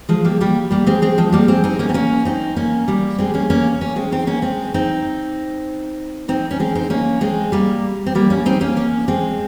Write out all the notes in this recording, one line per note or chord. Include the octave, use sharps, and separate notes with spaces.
F3 G#3
G3 A#3
G3 A#3
G3 A#3
G#3 C4
G#3 C4
F3 G#3
G3 A#3
G#3 C4
C4 D#4
A#3 C#4
C4
A#3 C#4
C4 D#4
A#3 C#4
G3 A#3
G#3 C4
A#3 C#4
A#3 C#4
A#3 C#4
G#3 C4
C4 D#4
A#3 C#4
G#3 C4
C4 D#4
C4 D#4
C#4
G#3 C4
C4 D#4
A#3 C#4
G#3 C4
G3 A#3
C4
G3 A#3
A#3 C#4
C4 D#4
A#3 C#4
A#3 C#4
G#3 C4